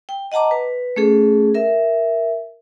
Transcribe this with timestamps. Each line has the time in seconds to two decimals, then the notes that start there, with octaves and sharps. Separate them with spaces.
0.09 G5
0.32 D#5 F#5 A5 A#5 D6
0.51 B4
0.96 A3 C#4 G#4 A4
1.54 A#4 E5